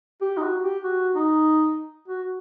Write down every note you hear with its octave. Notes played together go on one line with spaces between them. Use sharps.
G4
D#4
F#4
G4
F#4
D#4
F#4